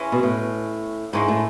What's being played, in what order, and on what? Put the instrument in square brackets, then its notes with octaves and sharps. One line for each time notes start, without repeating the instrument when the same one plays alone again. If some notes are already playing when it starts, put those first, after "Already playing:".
Already playing: [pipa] E3 G#3 C#4
[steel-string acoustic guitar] B2
A2
[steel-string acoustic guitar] G#2 [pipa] G#3 C#4 E4
[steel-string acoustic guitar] A2